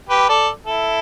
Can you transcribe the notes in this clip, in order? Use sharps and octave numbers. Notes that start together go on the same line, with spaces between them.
G4 B4
A4 D5
E4 A4